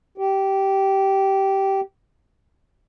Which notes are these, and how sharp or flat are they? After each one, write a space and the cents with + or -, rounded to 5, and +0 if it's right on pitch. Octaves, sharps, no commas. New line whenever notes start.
G4 -15